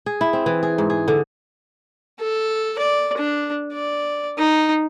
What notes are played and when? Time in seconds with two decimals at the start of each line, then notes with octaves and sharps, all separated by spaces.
0.06 G#4
0.21 E4
0.33 C4
0.46 E3
0.63 G#4
0.78 G#2
0.90 G#4
1.08 D3
2.20 A4
2.79 D5
3.18 D4
3.73 D5
4.38 D#4